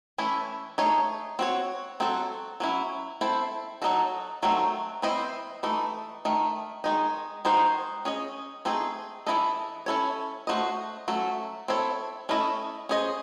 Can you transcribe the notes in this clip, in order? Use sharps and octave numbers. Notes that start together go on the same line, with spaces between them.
E3 A3 C#4 E4
A3 D#4 G#4 C#5
C4 F#4 C#5
F#3 C4 F#4 A4
F#3 C#4 E4
C4 E4 A4 C5
F#3 A3 D#4 F#4 A4
D#3 F#3 A3 C4
E3 C4 E4 C5 D#5
E3 A3 D#4
D#3 A3
D#3 G#3 D#4
D#3 G#3 D#4 F#4 C5
C#4 G#4 D#5
A3 C4 D#4 G#4
E3 C4 E4 A4 D#5
C#4 E4 A4 C#5
A3 D#4 F#4 C5 D#5
F#3 A3 C#4 F#4
C4 E4 A4 C#5
A3 C#4 E4 A4 D#5
C#4 G#4 C5 D#5